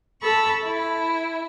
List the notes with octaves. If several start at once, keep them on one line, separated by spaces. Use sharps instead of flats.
A4 A5 B5 C#6
E4